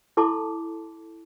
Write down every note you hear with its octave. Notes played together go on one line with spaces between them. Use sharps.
E4 A4 A5 C6 D6